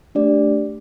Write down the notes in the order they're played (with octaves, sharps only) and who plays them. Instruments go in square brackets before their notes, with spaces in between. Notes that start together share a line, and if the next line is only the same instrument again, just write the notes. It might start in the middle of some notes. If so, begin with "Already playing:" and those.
[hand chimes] A3 D4 G4 D5